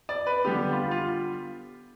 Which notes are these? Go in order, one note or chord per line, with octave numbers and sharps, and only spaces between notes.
D5
B4
D3 G3 B3 G4
F4
F4